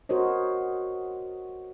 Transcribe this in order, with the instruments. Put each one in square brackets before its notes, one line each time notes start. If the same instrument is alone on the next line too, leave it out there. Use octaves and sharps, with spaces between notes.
[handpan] F#4 A#4 C5 C#5 D#5